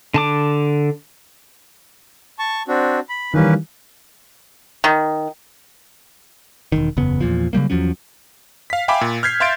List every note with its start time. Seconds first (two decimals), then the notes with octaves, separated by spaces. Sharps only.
0.14 D3 A5 D6
2.39 A5 C#6
2.68 C4 D4 F#4
3.09 B5
3.34 D#3 E3 G3 A#3 C#4 B4
4.84 D#3
6.72 E1 C2 D#3
6.97 F#1 E2 C#3 B3
7.21 E2 A#2 F3
7.53 C#3 F#3 G3 A#3
7.70 E2 F3 F#3 C#4
8.70 F5 B6
8.88 E5 F5 G5 G#5 B5 D6
9.01 A#2
9.23 F6 G6 G#6 B6 C7
9.40 E5 F5 C6 G6 A6 D7